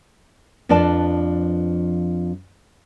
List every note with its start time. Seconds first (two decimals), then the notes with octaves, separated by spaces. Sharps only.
0.69 F2 F3 D4 B4 D5 A5